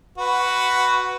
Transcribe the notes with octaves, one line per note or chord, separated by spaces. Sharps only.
F#4 B4